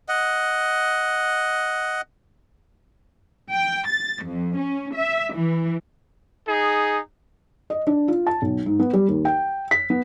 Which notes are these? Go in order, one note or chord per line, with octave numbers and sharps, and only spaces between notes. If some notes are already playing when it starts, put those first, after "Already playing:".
D#5 F#5
G5
A6
F2
C#4
E5
E3
D#4 G#4
D#5
D4
F4
A5
B1
G#2
B3
G3
D#2
G5
B6
B3